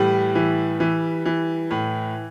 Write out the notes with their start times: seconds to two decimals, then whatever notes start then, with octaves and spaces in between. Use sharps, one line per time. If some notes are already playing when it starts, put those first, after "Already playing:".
Already playing: A2 E3 G3
0.35 E3
0.80 E3
1.25 E3
1.71 A2